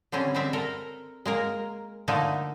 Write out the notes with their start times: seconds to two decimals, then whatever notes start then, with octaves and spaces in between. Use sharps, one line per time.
0.12 D3 G3 C4 C#4
0.34 G3 G#3 C4 E5
0.53 A4 A#4
1.25 G#3 A#3 A#4
2.08 D3 F3 A3 A#3 D#4